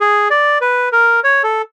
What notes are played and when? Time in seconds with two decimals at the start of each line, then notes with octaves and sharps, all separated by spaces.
0.01 G#4
0.31 D5
0.61 B4
0.92 A#4
1.24 C#5
1.43 A4